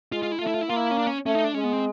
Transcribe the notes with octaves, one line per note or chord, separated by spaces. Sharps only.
G#3 F4
F4
E4
A3 F4
E4
F4
E4
A#3 F4
E4
C#4
D4
C#4
A3 C#4
D#4
D4
G#3 C#4
B3
C4